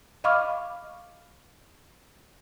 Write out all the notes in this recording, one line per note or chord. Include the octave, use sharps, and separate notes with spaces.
D#5 F5 B5 C#6 D6 F6